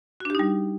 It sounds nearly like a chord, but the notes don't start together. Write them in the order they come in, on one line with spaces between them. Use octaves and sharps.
F#4 D4 G4 D#4 G3